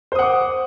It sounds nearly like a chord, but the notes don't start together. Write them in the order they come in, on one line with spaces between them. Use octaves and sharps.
C5 D#6 F#5 D6